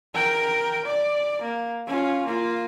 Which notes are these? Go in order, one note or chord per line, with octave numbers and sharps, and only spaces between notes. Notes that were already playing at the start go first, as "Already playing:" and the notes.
A#4 G5
D5
A#3
C#4 F4
A#3 F4